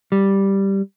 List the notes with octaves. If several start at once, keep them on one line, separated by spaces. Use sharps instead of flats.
G3